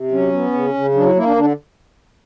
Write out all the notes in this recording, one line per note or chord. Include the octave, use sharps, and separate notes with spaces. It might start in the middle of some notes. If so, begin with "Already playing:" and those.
Already playing: C3
F#3 C#4
B3
C#3
C#3
F#3 D4
E4
A#3 E4
D4
D3 D4